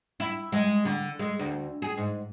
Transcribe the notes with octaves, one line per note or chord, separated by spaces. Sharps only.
E4
G#3
D3
G#3
D2
G#4
G#2